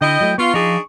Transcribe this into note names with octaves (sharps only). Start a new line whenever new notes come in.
D3 E4 D#5 G5
F#3 A3
B3 F4 C#6
F3 D4 D#4 F4 G#4